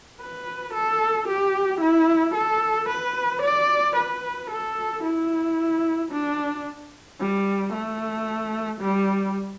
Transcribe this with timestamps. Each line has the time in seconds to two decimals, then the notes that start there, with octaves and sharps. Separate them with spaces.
0.21 B4
0.74 A4
1.28 G4
1.81 E4
2.35 A4
2.89 B4
3.42 D5
3.97 B4
4.51 A4
5.04 E4
6.12 D4
7.20 G3
7.73 A3
8.81 G3